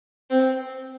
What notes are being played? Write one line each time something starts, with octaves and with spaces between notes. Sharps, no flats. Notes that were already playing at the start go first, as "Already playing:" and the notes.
C4